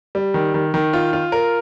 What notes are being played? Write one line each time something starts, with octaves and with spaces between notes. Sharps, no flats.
G3
D#3
D#3
D#3
F4
F4
A#4